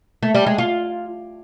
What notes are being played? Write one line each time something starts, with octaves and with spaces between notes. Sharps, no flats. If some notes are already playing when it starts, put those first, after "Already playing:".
A3
G3
G#3
F4